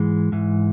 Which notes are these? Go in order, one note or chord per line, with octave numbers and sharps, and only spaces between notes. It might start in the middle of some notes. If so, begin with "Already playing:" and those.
Already playing: G#2 E3 G#3
G#2 E3